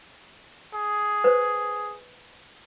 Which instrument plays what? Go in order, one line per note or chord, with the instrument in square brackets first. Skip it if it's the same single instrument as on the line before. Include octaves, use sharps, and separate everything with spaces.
[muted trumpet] G#4
[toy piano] B4 C5